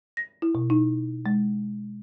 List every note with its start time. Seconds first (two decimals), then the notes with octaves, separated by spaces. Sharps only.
0.17 A#6
0.42 E4
0.55 B2
0.70 D#4
1.26 G#3